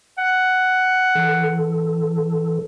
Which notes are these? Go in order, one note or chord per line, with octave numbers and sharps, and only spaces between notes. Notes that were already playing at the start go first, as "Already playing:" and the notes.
F#5
E3 A4